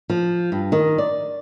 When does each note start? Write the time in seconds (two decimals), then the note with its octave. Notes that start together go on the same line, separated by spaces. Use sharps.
0.10 F3
0.52 G2
0.72 D#3
0.98 D5